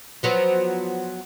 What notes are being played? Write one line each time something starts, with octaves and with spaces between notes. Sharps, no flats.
F3 F#3 B3